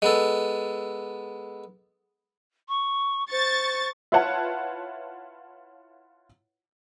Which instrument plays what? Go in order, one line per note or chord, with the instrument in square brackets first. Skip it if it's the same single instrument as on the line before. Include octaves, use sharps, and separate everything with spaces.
[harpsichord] G#3 B3 A4
[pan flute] C#6
[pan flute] C5 [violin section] C#6 A6
[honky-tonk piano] E4 F4 B4 C#5 F#5 A5